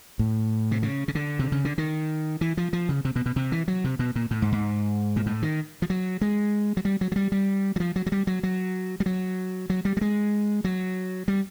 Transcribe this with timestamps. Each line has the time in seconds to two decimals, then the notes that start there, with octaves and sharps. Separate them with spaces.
0.19 A2
0.71 C3
0.83 C#3
1.08 C#3
1.15 D3
1.39 C3
1.52 C#3
1.65 D3
1.78 D#3
2.41 E3
2.57 F3
2.73 F3
2.89 C#3
3.05 C3
3.16 B2
3.26 B2
3.36 C3
3.52 E3
3.68 F#3
3.84 C3
3.99 B2
4.16 A#2
4.31 A2
4.42 G#2
4.52 G#2
5.16 A#2
5.26 A2
5.42 D#3
5.82 F3
5.90 F#3
6.21 G#3
6.77 F#3
6.85 G3
7.01 F#3
7.12 F#3
7.16 G3
7.32 G3
7.76 F#3
7.80 F3
7.96 F#3
8.06 F#3
8.12 G3
8.27 F#3
8.43 F#3
9.00 G3
9.06 F#3
9.70 F#3
9.85 G3
9.97 G3
10.01 G#3
10.64 F#3
11.28 G3